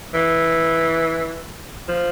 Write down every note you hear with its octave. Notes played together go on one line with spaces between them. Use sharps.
E3
F3